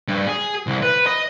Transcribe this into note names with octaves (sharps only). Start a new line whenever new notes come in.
G2
G#4
C2
B4
D#5